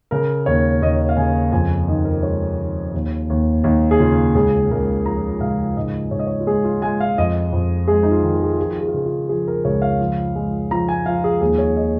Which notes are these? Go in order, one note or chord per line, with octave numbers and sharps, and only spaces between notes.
C#3 A#4
D#2 C#5
D#2 D#5
F5
C#3 G#5
F2 G#5
D#3 D#5
A#4
G#3 C#5
D#3
D#2
D#2
D#2 D#4
G#4
C#3 F4
C#2 G#4
C#2 A#4
F3 A#5
C#2 F5
G#2 D#5
G#2 C#5
D#5
C#5
F4
G#3 G#4
F4
G#3 G#5
F5
F2 D#5
F2
G#3 G#4
D#4
F4
D#3
F4
G#4
F4
F3 G#4
F4
G#4
F4
C#3 G#4
F4
F3 G#4
A#4
C#2 C#5
F5
F3
G#3
F3 A#5
G#5
F3 F5
G#4
D#2 G#4
C#5
D#5